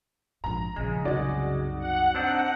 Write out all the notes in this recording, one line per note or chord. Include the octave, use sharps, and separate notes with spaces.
A#1 G#2 A#5
A#1 C#3 G#3
C2 F#2 D#4 F#4 D5
F#5
C4 D4 D#4